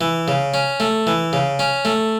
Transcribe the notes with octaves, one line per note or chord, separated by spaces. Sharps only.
E3
C#3
C#4
A3
E3
C#3
C#4
A3